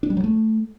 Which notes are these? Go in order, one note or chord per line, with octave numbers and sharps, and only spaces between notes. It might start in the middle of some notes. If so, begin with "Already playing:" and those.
D4
G3
F#3
A3